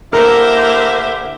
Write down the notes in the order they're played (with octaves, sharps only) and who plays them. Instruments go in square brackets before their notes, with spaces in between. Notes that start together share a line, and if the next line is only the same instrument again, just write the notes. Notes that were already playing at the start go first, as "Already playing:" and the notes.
[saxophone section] D3 E4 G4 [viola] A#3 C5 [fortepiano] A#4 [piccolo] E5